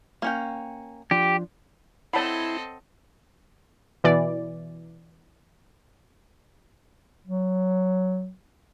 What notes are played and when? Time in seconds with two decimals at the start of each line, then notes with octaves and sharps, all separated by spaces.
0.22 A#3 C#4 G5
1.11 F3 D4 G4
2.13 C4 E4 A4 C#5 D#5 F#5 A5 B5
4.04 B2 E3 D5
7.27 F#3